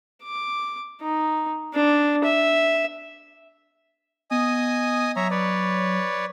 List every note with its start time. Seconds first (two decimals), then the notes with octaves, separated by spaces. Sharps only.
0.23 D6
1.02 D#4
1.74 D4
2.24 E5
4.31 B3 D#5 G#5 D#6
5.16 F#3 C#5 E5 A#5
5.31 B4 C#5 D5